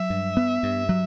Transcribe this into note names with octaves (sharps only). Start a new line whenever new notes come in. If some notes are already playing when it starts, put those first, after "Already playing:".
Already playing: F#3 E5
G2
B3
G2
F#3